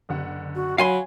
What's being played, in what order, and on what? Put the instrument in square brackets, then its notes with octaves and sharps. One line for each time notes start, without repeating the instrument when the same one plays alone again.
[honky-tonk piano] F#1 D3 F#5
[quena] F#4
[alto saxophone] F#3 [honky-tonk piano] C#5 [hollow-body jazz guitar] F5 G#5 C6 [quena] B5